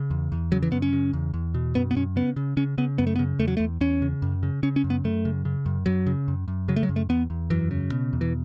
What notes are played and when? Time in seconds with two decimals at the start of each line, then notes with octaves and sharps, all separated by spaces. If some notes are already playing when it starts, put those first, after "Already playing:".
Already playing: C#3
0.11 E2
0.32 E2
0.52 C#3 F#3
0.62 E3
0.72 F#2 B3
0.82 C#4
0.93 C#3
1.13 E2
1.34 E2
1.54 B2
1.75 F#2 B3
1.91 B3
1.96 F#2 C#4
2.16 C#3 B3
2.36 C#3
2.57 C#3 C#4
2.78 C#3 B3
2.98 F#2 B3
3.07 A3
3.16 B3
3.19 C#3
3.39 E2 A3
3.48 F#3
3.57 A3
3.60 E2
3.81 E2 C#4
4.02 C#3
4.22 F#2
4.43 C#3
4.63 C#3 C#4
4.76 C#4
4.84 F#2
4.90 B3
5.04 F#2 A3
5.25 C#3
5.45 C#3
5.66 F#2
5.86 F#2 F#3
6.06 C#3
6.28 F#2
6.48 F#2
6.68 C#3 F#3
6.76 A3
6.83 F#3
6.89 F#2
6.96 A3
7.09 E2 B3
7.30 E2
7.50 F#2 E3
7.71 C#3
7.92 B2
8.13 E2
8.21 E3